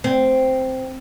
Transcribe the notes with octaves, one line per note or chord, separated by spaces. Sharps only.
C4